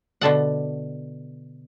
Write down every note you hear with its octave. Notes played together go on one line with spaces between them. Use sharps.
B2 D3 A4 F#5